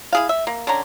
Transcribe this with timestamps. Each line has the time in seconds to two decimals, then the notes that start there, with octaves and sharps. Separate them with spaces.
0.13 E4 G#4 F5
0.29 E5
0.47 A#3
0.67 D3 C#4 A#5